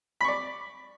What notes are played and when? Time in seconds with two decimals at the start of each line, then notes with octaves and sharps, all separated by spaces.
0.21 B5
0.24 C#6
0.28 D5